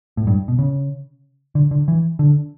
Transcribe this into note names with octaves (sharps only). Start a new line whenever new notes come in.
A2
G2
B2
C#3
D3
D3
E3
D3